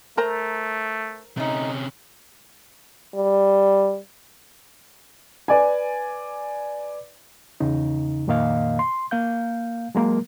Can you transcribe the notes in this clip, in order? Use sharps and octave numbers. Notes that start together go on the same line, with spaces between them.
A3 A#4 C5 A#5
C3 A3 C#4 D#4
G3
B4 D5 G#5
E2 C#3 D#4
F2 A#2 D#3 A#3 D#5 F5
C6
A#3 F5 G6
F#3 G#3 A#3 A#4